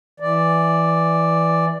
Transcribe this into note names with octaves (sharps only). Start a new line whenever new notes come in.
E3 D5